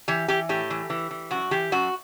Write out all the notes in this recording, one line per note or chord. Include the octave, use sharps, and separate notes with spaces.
E3 G4
E3 G4
A2 G4
E3
E3
E3
F#2 F#4
E3 G4
F#2 F#4